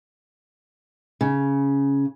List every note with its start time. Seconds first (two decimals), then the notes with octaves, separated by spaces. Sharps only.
1.21 C#3